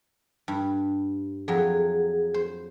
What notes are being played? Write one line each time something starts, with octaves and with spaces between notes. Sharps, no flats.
G2
F2 F#3 G#4
C5